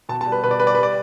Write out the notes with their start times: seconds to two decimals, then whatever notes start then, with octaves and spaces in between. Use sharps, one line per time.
0.09 B2 A5
0.21 A5
0.26 G3
0.32 B4
0.44 B2 B4
0.51 D5
0.60 G3 B4
0.67 D5
0.75 G3 B4
0.83 D5